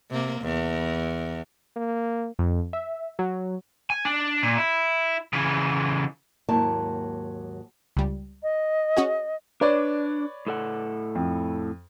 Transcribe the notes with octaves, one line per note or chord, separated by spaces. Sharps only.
C3 A#3
E2
A#3
F2
E5
F#3
G#5
D4
A#2
E4
C#3 E3
D#2 G#2 F#3 A#3 E4 A5
C#2 G3
D#5
C#4 F#4 G#4
D4 B4 C#5 D5
A2 A4 F#5
F2